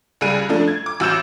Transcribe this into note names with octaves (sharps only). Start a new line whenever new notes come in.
C#2 G3 G#4 F#6 D#7
F3 A3 D4
G#6
D6
A1 F#4 E6 F6 G6 E7